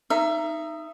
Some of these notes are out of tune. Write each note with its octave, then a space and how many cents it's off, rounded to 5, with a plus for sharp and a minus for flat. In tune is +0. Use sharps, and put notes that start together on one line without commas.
D#4 +0 E5 +25